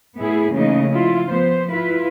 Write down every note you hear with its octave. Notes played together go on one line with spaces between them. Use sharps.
A2 B3 E4 G#4
C#3 E3 A3 A#3 D#4 D#5
F3 E4 F4
F3 B3 C5
E4 F4 B4